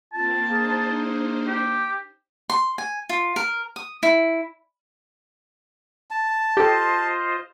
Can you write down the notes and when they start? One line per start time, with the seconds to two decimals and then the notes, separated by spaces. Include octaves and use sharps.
0.13 A#3 C4 F4 A5
0.50 A#3 D4 D#4 G#4 C5
1.46 G4
2.50 C6
2.78 G#5
3.09 F4
3.36 A#4
3.76 D#6
4.03 E4
6.11 A5
6.57 F4 G4 A4 C5 D#5